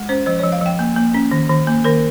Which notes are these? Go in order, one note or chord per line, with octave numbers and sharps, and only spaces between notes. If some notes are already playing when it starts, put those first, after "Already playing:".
Already playing: G#3
C#4 C5
F3 C5
F3 C#5
F5
F3 G5
A#3
A#3
C#4
D#3
D#3
A#3
D#3 A#4